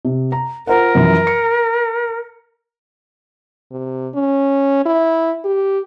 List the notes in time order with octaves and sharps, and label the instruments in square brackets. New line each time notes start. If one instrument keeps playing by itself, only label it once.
[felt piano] C3
A#5
[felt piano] F4 C5 F#5 [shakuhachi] A#4
[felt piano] F#2 E3 F3
C#7
[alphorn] C3
C#4
E4
G4